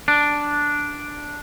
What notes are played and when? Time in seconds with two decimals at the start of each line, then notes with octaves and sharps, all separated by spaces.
0.08 D4